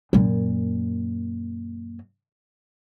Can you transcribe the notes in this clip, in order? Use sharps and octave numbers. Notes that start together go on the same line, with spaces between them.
F#2 A#2